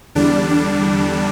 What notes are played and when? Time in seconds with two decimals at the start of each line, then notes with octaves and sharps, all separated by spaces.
0.15 E2 D3 G3 D4
0.50 D4